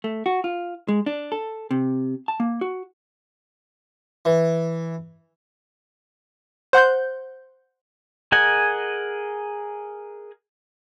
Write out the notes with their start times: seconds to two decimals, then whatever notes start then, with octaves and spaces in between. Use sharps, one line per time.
0.04 A3
0.26 F#4
0.44 F4
0.88 G#3
1.06 D4
1.32 A4
1.71 C3
2.28 A5
2.40 A#3
2.61 F#4
4.25 E3
6.73 C5 F#5 C6 G6
8.32 G#4 A#4 D#5 F#5 G#5